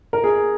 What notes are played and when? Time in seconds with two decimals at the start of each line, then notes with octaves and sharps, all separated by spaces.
0.13 A#4
0.24 G#4